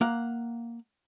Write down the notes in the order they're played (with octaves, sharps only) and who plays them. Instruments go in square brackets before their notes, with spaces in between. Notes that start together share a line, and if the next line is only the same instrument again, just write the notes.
[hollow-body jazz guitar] A#3 F5 F#5